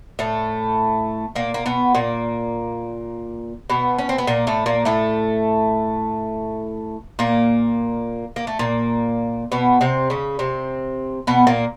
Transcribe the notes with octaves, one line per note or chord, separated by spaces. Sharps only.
A2 A3
A#2 A#3
A#3
B2 B3
A#2 A#3
B2 B3
C#4
C4
B3
A#2 A#3
A2 A3
A#2 A#3
A2 A3
A#2 A#3
A#3
A3
A#2 A#3
B2 B3
C3 C4
C#3 C#4
C3 C4
B2 B3
A#2 A#3